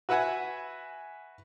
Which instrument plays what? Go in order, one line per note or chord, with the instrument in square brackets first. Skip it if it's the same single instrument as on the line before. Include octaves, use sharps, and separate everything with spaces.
[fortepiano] F#4 B4 E5 F#5 G#5